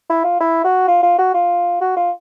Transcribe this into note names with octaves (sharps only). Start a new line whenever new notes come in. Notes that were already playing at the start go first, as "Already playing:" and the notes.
E4
F4
E4
F#4
F4
F4
F#4
F4
F#4
F4